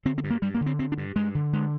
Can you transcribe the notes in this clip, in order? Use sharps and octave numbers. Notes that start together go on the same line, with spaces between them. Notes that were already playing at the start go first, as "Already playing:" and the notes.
D3 C4
C4
G2
A#3
G2 G3
A#3
D3
C4
D3 C4
D4
G2
G2 G#3
D3
D3 G#3